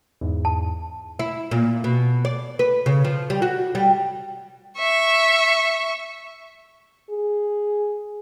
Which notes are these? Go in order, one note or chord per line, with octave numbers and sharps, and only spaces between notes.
E2 G#2
A5
E4
A#2
B2
D5
B4
C#3
F3
G3
F#4
G3
E5 C#6
G#4